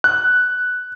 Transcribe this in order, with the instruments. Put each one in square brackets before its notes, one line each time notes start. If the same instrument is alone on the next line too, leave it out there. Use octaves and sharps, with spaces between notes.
[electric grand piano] F#6